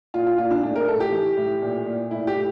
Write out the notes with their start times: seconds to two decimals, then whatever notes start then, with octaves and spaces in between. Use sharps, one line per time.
0.14 A#2 F4
0.27 F4
0.38 A#2 F4
0.51 D4
0.63 A2 D4
0.76 A#4
0.88 A2 A4
1.00 G4
1.12 E3
1.37 A2
1.62 A#2
1.86 A#2
2.11 A2 E4
2.27 G4
2.36 A2